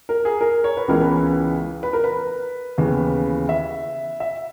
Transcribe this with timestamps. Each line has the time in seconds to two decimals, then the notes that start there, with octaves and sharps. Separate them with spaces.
0.09 A#4
0.25 G#4
0.41 A#4
0.64 C#5
0.77 B4
0.88 C#2 C#3 E3 B3 A#4
1.01 B4
1.83 B4
1.93 A#4
2.04 B4
2.78 D#2 C#3 E3 B3
3.49 E5
4.20 E5